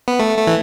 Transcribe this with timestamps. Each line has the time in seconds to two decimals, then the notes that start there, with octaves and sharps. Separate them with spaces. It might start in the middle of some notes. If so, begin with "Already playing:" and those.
0.08 B3
0.19 A3
0.38 A3
0.47 E3